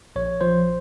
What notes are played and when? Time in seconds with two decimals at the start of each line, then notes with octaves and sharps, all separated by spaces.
0.16 A#1 C#5
0.41 F3 C5